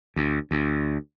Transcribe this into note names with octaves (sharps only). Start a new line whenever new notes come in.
D2
D2